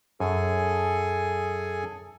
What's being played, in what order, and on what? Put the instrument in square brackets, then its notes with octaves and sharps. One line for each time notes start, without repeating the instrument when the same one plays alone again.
[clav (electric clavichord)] F#2 [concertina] G#4 A4 G#5